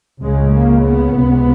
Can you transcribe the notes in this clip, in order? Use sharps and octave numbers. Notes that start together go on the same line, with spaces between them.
C#2 C#3 G#3
A#3
B3
C#2 C3